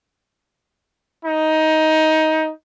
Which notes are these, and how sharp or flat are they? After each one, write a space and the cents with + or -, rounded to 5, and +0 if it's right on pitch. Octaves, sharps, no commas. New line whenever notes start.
D#4 +15